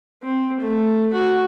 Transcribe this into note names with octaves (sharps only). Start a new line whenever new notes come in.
C4
A3
F#4